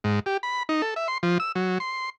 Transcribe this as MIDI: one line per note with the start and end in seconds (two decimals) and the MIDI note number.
0.04 0.20 44
0.26 0.37 67
0.43 0.63 83
0.69 0.82 63
0.82 0.94 69
0.96 1.08 76
1.08 1.18 84
1.23 1.38 53
1.40 1.52 88
1.55 1.78 54
1.80 2.10 84